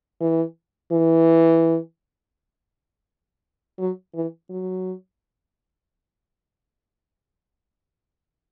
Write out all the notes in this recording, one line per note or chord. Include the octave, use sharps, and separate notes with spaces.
E3
E3
F#3
E3
F#3